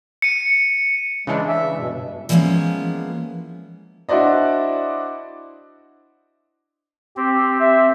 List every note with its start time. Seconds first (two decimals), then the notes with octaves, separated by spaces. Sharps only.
0.22 C#7 D#7
1.27 C#3 E3 G#3 D4
1.48 E5
1.78 G2 B2
2.29 E3 F3 G#3 A#3 B3 C#4
4.09 D4 E4 F#4 C5 D5 D#5
7.17 C4 G4
7.60 E5